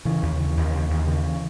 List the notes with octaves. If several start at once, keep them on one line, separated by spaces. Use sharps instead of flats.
C#3 E3
D#2
C#3
D#2
C#3
D#2
C#3